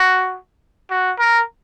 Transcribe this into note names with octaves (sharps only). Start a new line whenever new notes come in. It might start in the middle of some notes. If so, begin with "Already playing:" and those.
Already playing: F#4
F#4
A#4